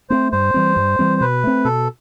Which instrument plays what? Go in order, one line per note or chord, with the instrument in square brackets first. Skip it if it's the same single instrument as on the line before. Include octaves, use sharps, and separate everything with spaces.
[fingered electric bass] A3 C4 [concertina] C5
[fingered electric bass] G2 [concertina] C5
[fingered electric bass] E3 G3 C4
G2
E3 G3 C4
[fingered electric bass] B2 [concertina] B4
[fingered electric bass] A3 C4
[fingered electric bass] B2 [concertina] A4